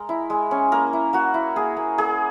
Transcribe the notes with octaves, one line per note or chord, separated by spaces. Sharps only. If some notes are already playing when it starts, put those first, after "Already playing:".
Already playing: G#3 A#4
E4
G#3
C#4
A#3 A#4
E4
A#3 F#4
E4
A#3 G#4
A#3
A#3 G#4